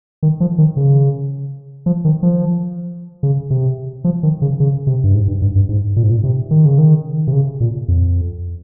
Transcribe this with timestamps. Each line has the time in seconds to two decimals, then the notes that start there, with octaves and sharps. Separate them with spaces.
0.23 D#3
0.40 F3
0.58 D#3
0.77 C#3
1.86 F3
2.05 D#3
2.23 F3
3.23 C#3
3.50 C3
4.04 F3
4.23 D#3
4.42 C#3
4.60 C#3
4.87 C3
5.04 G2
5.14 G#2
5.28 G2
5.42 G2
5.55 G2
5.69 G#2
5.96 A#2
6.03 G#2
6.10 A#2
6.24 C3
6.51 D#3
6.66 C#3
6.78 D#3
7.27 C3
7.32 C#3
7.60 A#2
7.88 F2